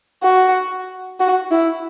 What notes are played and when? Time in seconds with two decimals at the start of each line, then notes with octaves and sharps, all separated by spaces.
0.23 F#4
1.20 F#4
1.51 E4